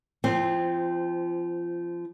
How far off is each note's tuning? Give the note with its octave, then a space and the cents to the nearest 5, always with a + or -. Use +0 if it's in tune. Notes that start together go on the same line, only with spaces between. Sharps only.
F3 -20 C4 +0